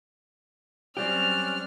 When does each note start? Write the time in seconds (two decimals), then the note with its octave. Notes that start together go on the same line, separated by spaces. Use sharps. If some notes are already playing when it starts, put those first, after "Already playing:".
0.97 F#3 G3 C4 C#4 G4 D5 F6 F#6